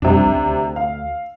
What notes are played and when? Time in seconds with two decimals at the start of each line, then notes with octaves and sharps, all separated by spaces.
0.02 F2 C3 G3 D4
0.25 C#2
0.46 D2
0.76 F5